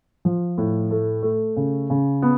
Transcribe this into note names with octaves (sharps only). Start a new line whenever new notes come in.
F3
A2
A3
A3
C#3
C#3
B3